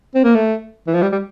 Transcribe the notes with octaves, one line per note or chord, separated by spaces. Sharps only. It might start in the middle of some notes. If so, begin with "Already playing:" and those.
C4
A#3
A3
E3
F3
G3
G3